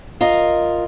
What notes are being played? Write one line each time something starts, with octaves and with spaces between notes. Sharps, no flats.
F4 A#4 D#5